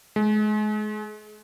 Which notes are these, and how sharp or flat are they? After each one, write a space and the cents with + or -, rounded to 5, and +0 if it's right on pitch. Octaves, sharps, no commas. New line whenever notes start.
G#3 +35